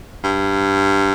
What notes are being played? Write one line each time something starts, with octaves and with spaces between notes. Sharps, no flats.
G2